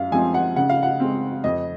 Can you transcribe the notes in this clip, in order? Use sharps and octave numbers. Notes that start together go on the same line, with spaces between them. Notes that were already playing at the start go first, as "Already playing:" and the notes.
Already playing: F#2 F5
F3 G#3 C4 G#5
F#5
C#3 F#5
F5
F#5
G#3 C4
F2 D#5